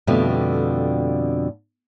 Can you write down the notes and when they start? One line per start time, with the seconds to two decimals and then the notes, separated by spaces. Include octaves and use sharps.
0.07 F2 B2 D3 G3 A3